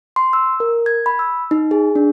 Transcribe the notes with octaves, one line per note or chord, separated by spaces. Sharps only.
C6
E6
A#4
G#6
B5
E6
D#4
G#4
D4